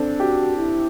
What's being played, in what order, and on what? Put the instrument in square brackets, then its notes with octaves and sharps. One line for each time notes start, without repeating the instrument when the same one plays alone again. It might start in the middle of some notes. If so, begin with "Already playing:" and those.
Already playing: [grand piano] C4 D4 A4
[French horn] F#4 [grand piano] G4
[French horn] E4